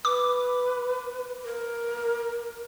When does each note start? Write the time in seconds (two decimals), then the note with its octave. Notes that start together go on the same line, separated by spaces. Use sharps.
0.05 B4 D6
1.44 A#4